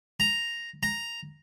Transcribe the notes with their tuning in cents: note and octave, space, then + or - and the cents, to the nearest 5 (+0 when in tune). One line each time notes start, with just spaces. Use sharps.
A#5 +0
A#5 +0